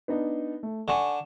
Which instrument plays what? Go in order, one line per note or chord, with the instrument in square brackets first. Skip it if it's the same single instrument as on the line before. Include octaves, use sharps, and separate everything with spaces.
[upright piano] B3 D4 D#4
A3
[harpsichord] D3 [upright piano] G#5 C#6 E7